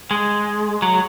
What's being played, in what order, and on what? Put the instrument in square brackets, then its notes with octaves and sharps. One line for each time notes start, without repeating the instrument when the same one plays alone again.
[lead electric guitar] G#3
F#3